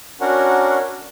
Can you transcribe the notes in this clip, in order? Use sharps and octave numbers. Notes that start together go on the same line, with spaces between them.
C#4 D4 F#4 A#4 F#5